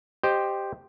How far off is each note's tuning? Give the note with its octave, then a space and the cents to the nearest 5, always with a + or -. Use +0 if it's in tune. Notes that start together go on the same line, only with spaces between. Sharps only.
G4 +0 C5 +0 D#5 -15